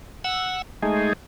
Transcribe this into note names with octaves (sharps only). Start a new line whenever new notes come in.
F#5 E6
G#3 A3 D#4 G#4